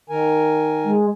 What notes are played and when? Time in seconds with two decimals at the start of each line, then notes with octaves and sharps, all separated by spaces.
0.10 D#3 A#4 G#5
0.85 G#3